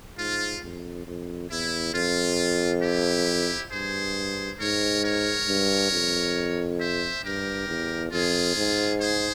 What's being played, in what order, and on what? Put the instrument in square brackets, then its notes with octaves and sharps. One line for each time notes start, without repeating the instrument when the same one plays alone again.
[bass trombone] G#2 [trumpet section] F4
[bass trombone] F2
F2
[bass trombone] E2 [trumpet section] E4
[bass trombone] F2 [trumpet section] F4
[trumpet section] E4 G4
[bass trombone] G2 [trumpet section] G#4 C5
[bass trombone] G#2 [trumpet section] A#4 C#5
[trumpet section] A#4 C#5
[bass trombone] G2
F2
[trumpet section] C5 E5
[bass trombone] G2 [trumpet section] G4 A#4
[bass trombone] E2
[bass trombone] F2 [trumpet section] F4 G#4
[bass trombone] G#2
[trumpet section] G#4 C5